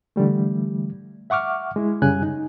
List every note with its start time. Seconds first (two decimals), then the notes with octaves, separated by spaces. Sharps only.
0.16 D3 E3 G3 A3
1.30 E5 F#5 C#6 D6 F6
1.76 G#3 E4
2.02 F#2 C#3 G3 G#5 F#6
2.22 D#4